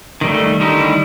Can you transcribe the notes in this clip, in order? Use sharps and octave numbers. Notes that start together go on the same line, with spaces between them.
D#3 G3 A3
D3 D#3 G3 D#4 E4